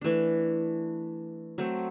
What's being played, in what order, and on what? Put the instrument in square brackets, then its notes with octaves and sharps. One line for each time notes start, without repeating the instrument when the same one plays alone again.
[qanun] E3 A3 D4
F#3 A3 C4